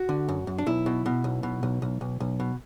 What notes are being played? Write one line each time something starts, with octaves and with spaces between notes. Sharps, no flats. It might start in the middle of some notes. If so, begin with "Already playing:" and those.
Already playing: F#4
D3
F#2
F#2
D4
B1 E4
B2
B2
B1
B2
B1
B1
B1
B1
B2